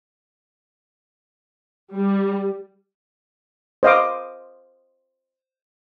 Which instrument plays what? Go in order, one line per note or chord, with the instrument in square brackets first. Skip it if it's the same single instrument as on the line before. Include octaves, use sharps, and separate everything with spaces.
[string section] G3
[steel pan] C5 D#5 F5 D6